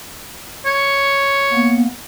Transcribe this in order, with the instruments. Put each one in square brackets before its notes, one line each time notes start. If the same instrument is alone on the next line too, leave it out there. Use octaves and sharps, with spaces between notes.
[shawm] C#5
[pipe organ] A#3 B3